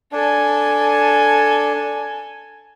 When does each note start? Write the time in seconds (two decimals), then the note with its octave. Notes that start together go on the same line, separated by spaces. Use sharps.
0.12 D4 A4 G#5